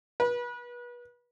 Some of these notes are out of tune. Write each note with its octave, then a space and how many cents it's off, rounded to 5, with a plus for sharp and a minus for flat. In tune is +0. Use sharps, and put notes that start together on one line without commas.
B4 -30